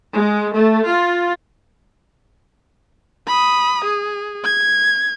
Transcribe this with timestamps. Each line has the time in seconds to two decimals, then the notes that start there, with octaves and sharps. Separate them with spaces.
0.15 G#3
0.54 A3
0.86 F4
3.28 B5 D#6
3.85 G#4
4.44 G#6